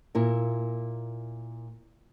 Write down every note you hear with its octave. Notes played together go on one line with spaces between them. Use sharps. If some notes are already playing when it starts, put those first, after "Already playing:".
A#2 E4 A#4